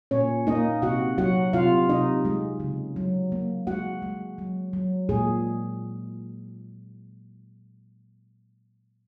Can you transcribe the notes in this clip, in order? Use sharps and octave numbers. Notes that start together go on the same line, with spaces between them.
A#2 C#4 C#5
A#3 D#4 D#5
C3 F#4 F#5
F#3 F#4 F#5
C3 F4 F5
C3 D#4 D#5
G#3
C#3
F#3
A#3
G#3 F#4 F#5
G#3
F#3
F#3
A#2 G#3 G#4